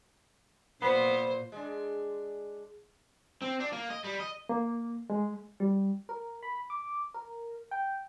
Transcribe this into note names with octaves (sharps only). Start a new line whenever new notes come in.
A#2 B3 C5
G#3 D4
C4
D4
A#3
D#5
G3
D#5
A#3
G#3
G3
A#4
B5
D6
A#4
G5